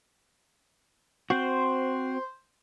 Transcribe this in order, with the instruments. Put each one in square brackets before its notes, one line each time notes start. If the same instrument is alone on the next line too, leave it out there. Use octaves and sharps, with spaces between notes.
[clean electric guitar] C4 F#4 [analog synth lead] C5